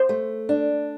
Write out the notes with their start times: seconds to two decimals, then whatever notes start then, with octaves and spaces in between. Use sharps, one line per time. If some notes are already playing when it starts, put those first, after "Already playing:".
Already playing: C5
0.09 A3
0.49 D4